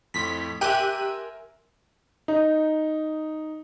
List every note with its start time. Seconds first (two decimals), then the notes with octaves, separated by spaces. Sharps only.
0.14 F2 A2 C6 B6
0.61 G4 A#4 E5 G5 G#5 C6 F#6 D#7
2.28 D#4